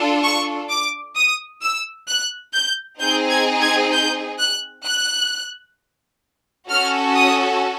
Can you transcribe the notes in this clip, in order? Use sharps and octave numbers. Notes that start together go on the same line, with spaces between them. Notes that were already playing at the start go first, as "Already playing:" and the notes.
Already playing: D4 F4 A4
C#6
D6
D#6
E6
F#6
G6
C4 D#4 G#4 G6
G#6
G#6
G6
F#6
F#6
C#4 F#4 A4 F6
D#6